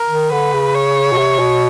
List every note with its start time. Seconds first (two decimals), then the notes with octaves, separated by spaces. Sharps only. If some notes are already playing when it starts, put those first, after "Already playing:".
Already playing: A#4
0.10 D#3
0.32 D3 B4
0.53 C#3
0.75 C#5
1.12 B2
1.18 C3
1.39 B2